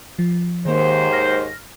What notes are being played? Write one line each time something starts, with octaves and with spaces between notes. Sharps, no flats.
F3
D#2 G#2 D#3 A#3 C5
F6 A#6